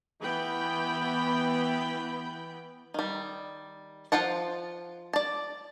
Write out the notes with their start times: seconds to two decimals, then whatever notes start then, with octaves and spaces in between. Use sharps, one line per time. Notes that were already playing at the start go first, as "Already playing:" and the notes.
0.22 E3 B3 G5 B5
2.94 D#3 G3
4.12 F3 F4 C5 F#5 A5
5.13 D5 A5